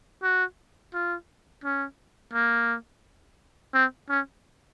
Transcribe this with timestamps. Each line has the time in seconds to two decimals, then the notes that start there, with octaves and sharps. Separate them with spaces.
0.23 F#4
0.94 F4
1.64 C#4
2.34 A#3
3.74 C4
4.09 C#4